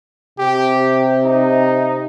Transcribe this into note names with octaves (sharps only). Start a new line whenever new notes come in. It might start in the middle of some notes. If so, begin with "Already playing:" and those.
C3 G4
D#4